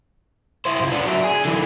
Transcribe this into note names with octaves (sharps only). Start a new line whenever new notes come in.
E4 C5
C#2 G2
B3 D4
F#3 E5
G#4
D3 E3